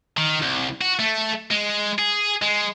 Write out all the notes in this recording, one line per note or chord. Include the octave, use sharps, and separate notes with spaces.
D#3
C2
F#4
A3
G#3
G#4
G#3